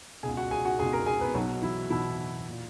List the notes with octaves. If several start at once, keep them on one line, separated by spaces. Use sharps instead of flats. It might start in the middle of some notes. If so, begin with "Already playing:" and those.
C#2 B2 G#4 G#5
F#4 F#5
G#4 G#5
F#4 F#5
C#2 B2 G#4 G#5
A#4 A#5
G#4 G#5
B3 B4
B1 B2 F#3 F#4
E3 E4
B1 B2 E3 E4
A#2